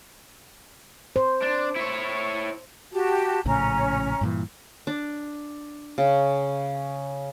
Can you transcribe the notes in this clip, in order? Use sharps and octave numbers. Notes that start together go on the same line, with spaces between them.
C5
D4
E4 C#5
F#4 G4 A5
A#1 A2 C#3 C#4 A#5
G2 A#2 E3
D4
C#3